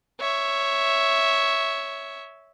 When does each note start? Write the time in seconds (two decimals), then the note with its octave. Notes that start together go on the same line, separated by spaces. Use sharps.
0.20 C#5 E5